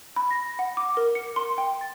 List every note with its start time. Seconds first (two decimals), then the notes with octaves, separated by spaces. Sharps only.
0.16 B5
0.31 A#6
0.59 F#5
0.77 D6
0.97 A#4
1.15 C#7
1.36 C6
1.58 G5
1.81 A6